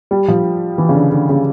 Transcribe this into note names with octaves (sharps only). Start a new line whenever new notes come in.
G3
F3
E3
C#3
D3
D3
C#3